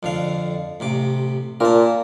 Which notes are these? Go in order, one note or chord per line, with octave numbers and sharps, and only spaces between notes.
F2 D3 F5
A1 C3 D6
A#2 A#4 A5